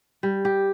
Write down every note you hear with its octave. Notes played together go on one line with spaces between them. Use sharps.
G3
G4